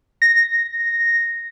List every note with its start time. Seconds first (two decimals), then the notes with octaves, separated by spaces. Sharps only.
0.22 A#6